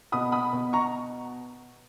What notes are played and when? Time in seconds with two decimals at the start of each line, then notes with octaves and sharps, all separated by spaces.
0.12 B2 B5 D#6
0.32 B5 D#6
0.53 B2
0.73 A#5 C#6